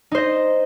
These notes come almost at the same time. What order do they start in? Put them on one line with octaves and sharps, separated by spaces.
D#4 C5 D#5